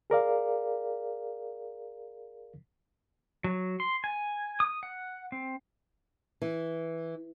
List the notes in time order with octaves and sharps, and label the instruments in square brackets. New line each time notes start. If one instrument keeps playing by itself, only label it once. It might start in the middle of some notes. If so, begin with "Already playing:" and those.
[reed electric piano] G#4 A#4 D5 F5
[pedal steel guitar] F#3
C6
G#5
D#6
F#5
C4
[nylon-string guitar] E3